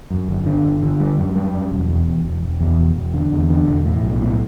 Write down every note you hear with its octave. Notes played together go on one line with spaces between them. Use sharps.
F#2
G1
D3
G1
D3
G3
F#2
G3
F#2
E1
E2
E1
E1
E1
E2
E1
E1
D3
E2
D3
E1
A2
B1
A2